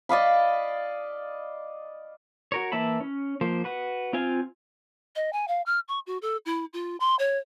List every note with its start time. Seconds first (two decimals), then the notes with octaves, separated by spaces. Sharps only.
0.09 D5 D#5 F5 B5
2.52 F#4 A#4 C#5
2.72 E3 A#3 E5 A5 B5
3.00 C#4
3.41 F3 A#3 C5
3.64 F#4 B4 F#5
4.13 C4 F4 F5 G#5
5.16 D#5
5.33 G#5
5.48 F5
5.66 F6
5.88 C#6
6.07 F#4
6.22 A4
6.46 E4
6.73 F4
7.00 C6
7.19 C#5